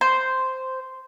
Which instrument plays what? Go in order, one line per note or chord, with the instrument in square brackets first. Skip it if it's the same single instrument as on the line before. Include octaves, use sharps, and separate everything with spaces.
[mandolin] C5